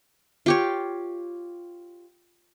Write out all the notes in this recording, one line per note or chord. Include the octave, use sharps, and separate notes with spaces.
F4 G4 C#5